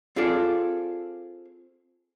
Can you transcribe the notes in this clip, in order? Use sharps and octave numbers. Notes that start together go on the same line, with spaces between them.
C4 F4 G#4 A4 D5